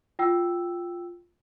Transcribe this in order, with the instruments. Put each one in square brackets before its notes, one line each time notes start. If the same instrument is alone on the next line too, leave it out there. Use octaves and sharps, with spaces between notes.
[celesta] F4 G5 E6